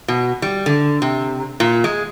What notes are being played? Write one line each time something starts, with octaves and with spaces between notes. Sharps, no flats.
B2
G3
D3
C3
A#2
G#3